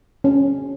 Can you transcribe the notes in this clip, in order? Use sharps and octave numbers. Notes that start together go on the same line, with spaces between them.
C#4